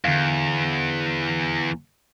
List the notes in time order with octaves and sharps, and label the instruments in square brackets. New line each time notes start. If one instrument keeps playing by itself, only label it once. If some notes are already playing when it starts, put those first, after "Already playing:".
[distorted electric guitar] E2 [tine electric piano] D3 F5